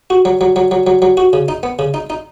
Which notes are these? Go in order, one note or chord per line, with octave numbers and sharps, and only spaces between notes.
F#4
F#3
F#3
F#3
F#3
F#3
F#3
F#4
C#3
D#4
B3
C#3
D#4
D#4